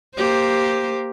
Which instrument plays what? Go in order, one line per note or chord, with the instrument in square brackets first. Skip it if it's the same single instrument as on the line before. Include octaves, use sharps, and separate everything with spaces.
[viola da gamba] A#3 G4 C5